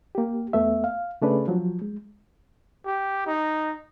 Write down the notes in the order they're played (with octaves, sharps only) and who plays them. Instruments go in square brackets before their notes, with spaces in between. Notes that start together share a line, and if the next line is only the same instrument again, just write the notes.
[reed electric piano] A#3 G4
E2 A3 B3 E5
F5
C#3 A3 C#4 D4 G#4 B4
F3 F#3
G#3
[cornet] G4
D#4